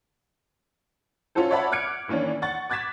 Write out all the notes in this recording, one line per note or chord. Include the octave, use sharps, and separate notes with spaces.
C#4 F4 F#4 A4 C5
C#5 D5 E5 F#5 A5 B5
D6 F6 F#6 G#6 C#7 D7
D#3 E3 A#3 C#4 D4
F#5 C#6 A6
D6 F#6 G#6 A6 B6 E7